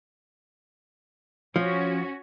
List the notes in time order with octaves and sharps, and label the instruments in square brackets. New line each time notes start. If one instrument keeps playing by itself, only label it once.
[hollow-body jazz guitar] F3 [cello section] C#4 F#4 C#5